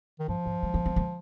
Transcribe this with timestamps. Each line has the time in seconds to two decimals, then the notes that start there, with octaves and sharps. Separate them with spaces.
0.20 D#3
0.28 G2 F3
0.46 G#2
0.63 G3
0.74 A#3
0.86 C4
0.96 A#3